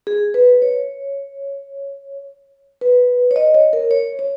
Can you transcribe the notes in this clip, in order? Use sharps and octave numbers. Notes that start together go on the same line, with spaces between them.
G#4
B4
C#5
B4
C#5
D#5
C#5
A#4
C#5
C#5